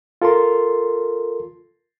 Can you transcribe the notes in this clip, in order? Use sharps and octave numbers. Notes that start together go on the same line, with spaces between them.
F4 A4 A#4 C6